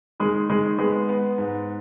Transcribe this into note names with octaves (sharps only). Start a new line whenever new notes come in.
D#3 G#3
D#3 G#3
G#3 B3
B3
G#2